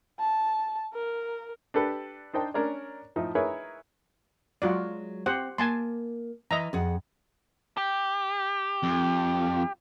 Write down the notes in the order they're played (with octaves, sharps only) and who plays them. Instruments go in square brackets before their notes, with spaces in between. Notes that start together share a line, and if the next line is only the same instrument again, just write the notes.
[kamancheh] A5
A#4
[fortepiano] D4 G4 A4 B4
D4 D#4 C5 G5 A5
C#4 D4 A#4 C#5 D5
A2 F3 D#4 E5 D#6
D#4 E4 G#4 A#4 B4 C#5
[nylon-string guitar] F#3 G#3 [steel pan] F4 F#4 D5
[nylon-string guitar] C4 [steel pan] G4 C5 F#5
[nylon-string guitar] A#3 [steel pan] G#5 A5 C6
[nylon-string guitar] E3 [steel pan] D#5 E5 A#5
[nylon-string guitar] F2 G#4 F#5
[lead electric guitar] G4
[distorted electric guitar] F2